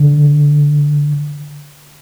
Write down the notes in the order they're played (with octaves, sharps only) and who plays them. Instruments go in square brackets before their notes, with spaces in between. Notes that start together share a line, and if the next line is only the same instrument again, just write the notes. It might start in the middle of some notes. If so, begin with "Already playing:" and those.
Already playing: [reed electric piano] D3